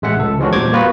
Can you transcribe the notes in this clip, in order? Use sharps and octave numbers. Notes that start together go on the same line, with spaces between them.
A1 G#3 E5 F#5
C#2 A4
E3 F3 G#3 C#4 D4 F#4
E2 A#2 G3 C5 D6 G#6
A#3 B3 F4 F#4 B4